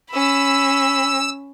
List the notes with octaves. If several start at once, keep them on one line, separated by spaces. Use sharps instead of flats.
C#4 B5 E6